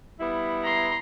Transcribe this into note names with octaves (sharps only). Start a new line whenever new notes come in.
G3 B3 E4
A#5 C6